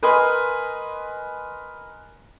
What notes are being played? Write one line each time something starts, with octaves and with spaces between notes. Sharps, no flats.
A#4 B4 D#5 G#5 B5 C6